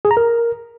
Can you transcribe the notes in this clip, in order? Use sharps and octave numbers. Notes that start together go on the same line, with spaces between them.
G#4
A#5
A#4